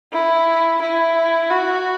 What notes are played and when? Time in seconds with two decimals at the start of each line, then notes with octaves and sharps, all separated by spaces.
0.13 E4
0.81 E4
1.50 F#4